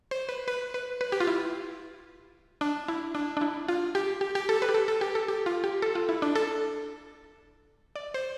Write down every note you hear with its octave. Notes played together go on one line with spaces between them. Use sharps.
C5
B4
B4
B4
B4
G4
F4
E4
D4
E4
D4
D4
E4
F4
G4
G4
G4
A4
B4
G4
A4
A4
G4
A4
G4
F4
G4
A4
F4
E4
D4
A4
D5
C5